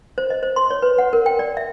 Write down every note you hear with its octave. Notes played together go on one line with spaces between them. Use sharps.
C5
D#5
C5
C6
C#5
B4
F#5
A#4
G5
D5
E5